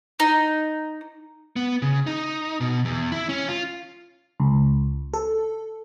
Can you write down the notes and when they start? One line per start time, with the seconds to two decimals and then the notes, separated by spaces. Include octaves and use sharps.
0.20 D#4
1.56 B3
1.82 C#3
2.07 D#4
2.60 B2
2.85 E2
3.12 E4
3.29 C#4
3.48 F4
4.40 C#2
5.14 A4